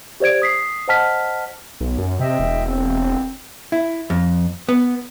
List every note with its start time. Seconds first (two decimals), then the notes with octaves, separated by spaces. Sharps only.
0.20 G4 C5 D5 G#6 D7
0.42 D#6 B6 C7
0.88 C5 D#5 F#5 A5 F6 B6
1.81 B1
1.98 F#2
2.20 C3 D#5 E5 G5
2.39 E1
2.66 C4
3.72 E4
4.10 F2
4.69 B3